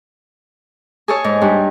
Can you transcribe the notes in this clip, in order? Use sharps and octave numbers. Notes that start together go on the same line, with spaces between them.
G#4 A4 C#5
G#2
G2